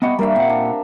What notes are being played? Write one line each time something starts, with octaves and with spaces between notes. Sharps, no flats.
G3 B3 D#5 F#5 B5 C#6
G3 A#3 D4 A#4 E5 F5
A#2 C4 F#5
D4